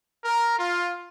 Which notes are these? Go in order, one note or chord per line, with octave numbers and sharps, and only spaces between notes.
A#4
F4